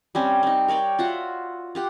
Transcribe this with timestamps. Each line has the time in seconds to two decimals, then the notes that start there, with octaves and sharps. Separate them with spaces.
0.15 G3 C4 C#4
0.43 C4 D#4
0.68 A#4 C#5 D5 G5
0.99 F4 F#4 E5 F#5
1.75 F4 G4 F#5